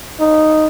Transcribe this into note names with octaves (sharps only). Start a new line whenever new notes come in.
D#4